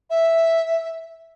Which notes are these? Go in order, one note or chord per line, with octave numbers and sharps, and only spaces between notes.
E5